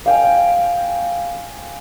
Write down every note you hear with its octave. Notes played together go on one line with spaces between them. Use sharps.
F5 G5 G#5